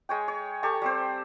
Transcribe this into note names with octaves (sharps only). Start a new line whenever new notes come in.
G#3 C#5 G5
C#5
G4 A4 A#5 C#6
G3 C4 C5